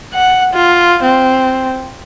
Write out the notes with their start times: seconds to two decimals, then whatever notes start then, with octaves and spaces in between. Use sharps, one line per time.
0.14 F#5
0.54 F4
1.03 C4